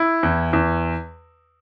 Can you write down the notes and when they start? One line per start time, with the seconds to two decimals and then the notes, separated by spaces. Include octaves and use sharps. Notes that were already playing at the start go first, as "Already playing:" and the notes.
Already playing: E4
0.23 E2
0.53 E2